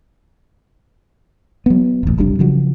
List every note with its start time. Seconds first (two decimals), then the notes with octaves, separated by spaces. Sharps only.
1.66 F#3 B3
2.03 D#1 A1
2.18 F#1 C2 G3 D4
2.39 C#3 F3 F#3